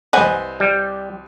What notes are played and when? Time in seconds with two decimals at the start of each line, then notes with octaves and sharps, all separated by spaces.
0.13 C2 B4 C5 D#5 F#5 G#5
0.60 G3